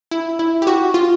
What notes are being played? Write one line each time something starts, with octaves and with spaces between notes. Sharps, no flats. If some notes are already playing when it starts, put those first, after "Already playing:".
E4
E4
G4
F#4
F4